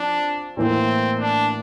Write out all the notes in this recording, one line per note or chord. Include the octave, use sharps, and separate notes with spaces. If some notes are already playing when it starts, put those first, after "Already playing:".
Already playing: F3 C4 D4
A2 E3 A#3 C4
D4